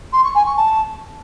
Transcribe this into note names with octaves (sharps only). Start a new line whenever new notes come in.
C6
C#6
G#5
C#6
A5